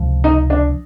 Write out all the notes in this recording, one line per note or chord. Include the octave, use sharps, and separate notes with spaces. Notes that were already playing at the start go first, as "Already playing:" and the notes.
Already playing: C#2 C3 F3
D#4
D4